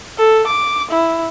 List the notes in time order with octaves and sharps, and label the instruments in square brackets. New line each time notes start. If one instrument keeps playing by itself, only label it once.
[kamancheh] A4
D6
E4